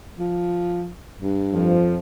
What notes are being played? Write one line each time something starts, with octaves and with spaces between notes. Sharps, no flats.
F3
G2
F2 F3